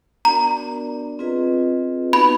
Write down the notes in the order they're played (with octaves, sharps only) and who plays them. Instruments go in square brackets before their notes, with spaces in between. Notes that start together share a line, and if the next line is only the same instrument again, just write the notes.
[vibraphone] B3 D4 F#4 A#4 D5 [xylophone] A#5
[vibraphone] C4 F4 G#4 B4 D#5
[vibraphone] B3 D#4 F#4 B4 [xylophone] B5